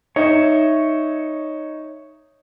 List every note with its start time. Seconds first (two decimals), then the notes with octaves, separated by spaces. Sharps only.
0.16 D#4 C#5 E5